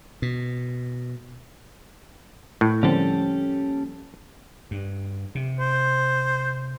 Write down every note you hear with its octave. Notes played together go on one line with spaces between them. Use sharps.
B2
A2
D3 F3 G3 A#3 C4 C#4 G4 A4
G2
C3
C5